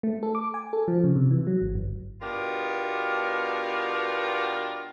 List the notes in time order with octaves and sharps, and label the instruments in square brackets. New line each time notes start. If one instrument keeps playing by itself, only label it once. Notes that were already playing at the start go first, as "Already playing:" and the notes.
[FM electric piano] A3
A4
D6
G#5
A4
F3
C#3
C3
E3
F#3
G#1
G1
[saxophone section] B2 B3 D4 F4 G4 A#4